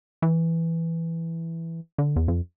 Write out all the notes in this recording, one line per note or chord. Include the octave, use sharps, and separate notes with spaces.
E3
D3
E2
F2